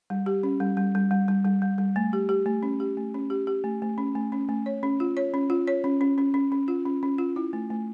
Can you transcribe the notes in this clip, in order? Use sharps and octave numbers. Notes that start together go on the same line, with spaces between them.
G3
G4
C#4
G3
G3
G3
G3
G3
G3
G3
G3
A3
G4
G4
A3
C#4
G4
A3
C#4
G4
G4
A3
A3
C#4
A3
C#4
A3
C#5
C#4
F4
C#5
C#4
F4
C#5
C#4
C#4
C#4
C#4
C#4
F4
C#4
C#4
F4
E4
A3
A3